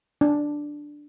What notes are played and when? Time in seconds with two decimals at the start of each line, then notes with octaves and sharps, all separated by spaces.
0.21 D4